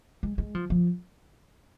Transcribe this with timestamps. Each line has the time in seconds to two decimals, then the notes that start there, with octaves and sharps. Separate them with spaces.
0.23 G#3
0.38 G#3
0.55 F3
0.70 F3